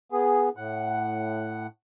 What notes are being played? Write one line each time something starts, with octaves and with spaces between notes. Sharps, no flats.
B3 G#4
A2 F#5